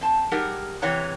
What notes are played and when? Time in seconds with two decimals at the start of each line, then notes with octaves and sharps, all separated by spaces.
0.01 C4 A5
0.31 G3 D#4 G4 G#4 A#4 F#5
0.82 C3 E3 C4 C#5 F#5 A#5